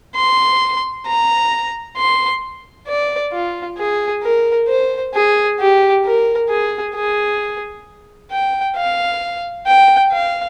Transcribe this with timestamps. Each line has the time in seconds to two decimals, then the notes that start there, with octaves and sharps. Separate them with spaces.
0.16 C6
1.06 A#5
1.97 C6
2.88 D5
3.33 F4
3.78 G#4
4.23 A#4
4.68 C5
5.14 G#4
5.60 G4
6.05 A#4
6.49 G#4
6.95 G#4
8.31 G5
8.76 F5
9.67 G5
10.12 F5